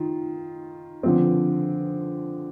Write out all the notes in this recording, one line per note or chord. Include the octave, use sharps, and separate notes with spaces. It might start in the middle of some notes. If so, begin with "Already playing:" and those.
Already playing: D#3 F4
D3 F3 C4